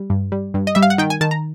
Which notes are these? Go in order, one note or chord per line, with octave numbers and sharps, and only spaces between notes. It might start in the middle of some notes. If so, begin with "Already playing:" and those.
Already playing: G3
G2
G3
G2
D#5
G3 E5
F5
F#5
D#3 G5
G#5
D#3 A5
A#5